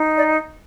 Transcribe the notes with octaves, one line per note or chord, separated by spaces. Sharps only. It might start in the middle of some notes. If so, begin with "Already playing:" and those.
Already playing: D#4
D5